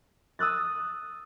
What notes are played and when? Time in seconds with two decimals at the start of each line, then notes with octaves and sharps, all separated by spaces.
0.39 D#6 E6 F#6 A6